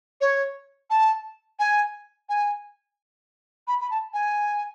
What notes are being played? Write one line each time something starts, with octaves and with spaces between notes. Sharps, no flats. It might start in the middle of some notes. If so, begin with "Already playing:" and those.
C#5
A5
G#5
G#5
B5
B5
A5
G#5